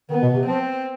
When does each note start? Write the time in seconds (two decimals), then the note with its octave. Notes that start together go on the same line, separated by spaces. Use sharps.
0.10 D#3 B3
0.22 B2
0.34 C3
0.46 F3 C4